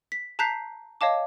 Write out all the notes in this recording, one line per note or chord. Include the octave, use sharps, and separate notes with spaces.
B6
A5 A#5 F#6 G6 B6 C7
C#5 D#5 F5 A5 D6